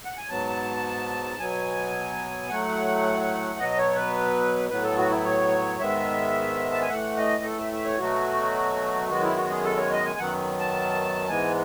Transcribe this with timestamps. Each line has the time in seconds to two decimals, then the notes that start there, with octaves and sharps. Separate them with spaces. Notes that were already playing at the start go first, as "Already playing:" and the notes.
0.05 F#5
0.17 G#5
0.29 G#2 F#3 B3 A5
1.39 B2 F#3 B3 G#5
2.49 A2 F#3 A3 F#5
3.59 B2 F#3 B3 D#5
3.77 C#5
3.95 B4
4.69 A2 F#3 B3 B4
4.83 A4
4.97 F#4
5.10 E4
5.24 C#5
5.79 G#2 D#3 G#3 B3 E5
6.72 A5
6.81 G#5
6.89 A2 E3 A3 F#5
7.17 D#5
7.43 A4
7.58 E5
7.72 E5
7.85 C#5
7.99 B2 F#3 A3 F#4
9.08 F#2 D#3 G#3 B3 F#4
9.22 E4
9.36 F#4
9.50 G#4
9.64 A4
9.77 C#5
9.91 D#5
10.05 G#5
10.19 F#2 D#3 F#3 B3 F#5
10.59 A5
11.28 G#2 E3 G#3 B3 G#5